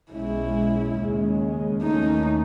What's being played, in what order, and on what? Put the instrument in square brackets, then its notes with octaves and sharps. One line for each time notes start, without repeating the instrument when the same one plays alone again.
[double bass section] B1 B2 G#3 C#4 [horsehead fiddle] E4
[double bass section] D#2 C#3 G#3 C#4
[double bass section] D#2 D#3 A3 C#4 [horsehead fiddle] D#4